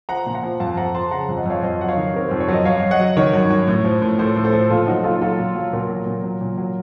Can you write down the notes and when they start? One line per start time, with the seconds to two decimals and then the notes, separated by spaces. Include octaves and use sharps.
0.09 F3 F#5 A#5
0.26 A#2
0.35 F#5 A#5
0.43 F3
0.60 F2 F5 A5
0.77 F2 F#5 A#5
0.94 F3 A5 C6
1.11 C#3 F#5 A#5
1.29 F2
1.37 D#5 F#5
1.46 F2 C#5 F5
1.63 F2 C5 D#5
1.79 F#3 F#5
1.88 C#5 F5
1.97 D#3
2.14 C3 A#4
2.28 F2 C5
2.40 C#5
2.48 F#3 D#5
2.65 F#2 C#5 F5
2.82 F#2
2.91 D#5 F#5
2.99 F#3
3.17 D#3 A#4 C#5
3.34 F#2
3.51 F#2
3.68 A2
3.85 F3
4.02 A2
4.19 F3 A4 C5
4.36 A2
4.44 A4 C5
4.53 F3
4.70 A#2 F4 A4
4.87 F#3 D#4 F#4
5.04 A#2 F4 A4
5.22 F#3 F4 A4
5.39 A#2
5.56 F#3
5.73 A#2 F#4 A#4
5.90 F#3
6.06 A#2
6.24 F#3
6.41 A#2
6.58 F#3